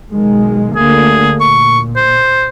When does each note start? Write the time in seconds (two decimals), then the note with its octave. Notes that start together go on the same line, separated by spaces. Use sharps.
0.10 B1 D#3 G#3
0.75 D2 D3 A#3 G#4
1.40 A#2 C#6
1.96 C5